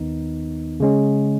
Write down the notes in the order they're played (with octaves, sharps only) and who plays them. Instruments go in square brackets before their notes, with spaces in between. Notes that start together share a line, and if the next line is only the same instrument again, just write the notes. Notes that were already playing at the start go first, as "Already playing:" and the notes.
Already playing: [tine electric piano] D#2 D#3 B3 D#4
C#3 G#3 C#4